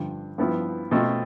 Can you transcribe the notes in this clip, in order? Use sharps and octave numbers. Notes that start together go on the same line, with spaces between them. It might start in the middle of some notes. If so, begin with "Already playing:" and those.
Already playing: G2 D3 F3
G2 F3 B3 E4
B2 A3 C4 F4